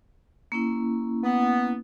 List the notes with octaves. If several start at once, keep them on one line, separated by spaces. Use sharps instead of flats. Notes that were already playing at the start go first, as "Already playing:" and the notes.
A#3 C#4 E4
B3